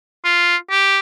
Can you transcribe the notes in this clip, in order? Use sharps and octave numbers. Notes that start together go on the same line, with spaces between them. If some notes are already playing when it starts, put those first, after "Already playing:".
F4
G4